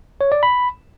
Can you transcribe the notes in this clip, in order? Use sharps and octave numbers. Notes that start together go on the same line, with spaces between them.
C#5
D5
B5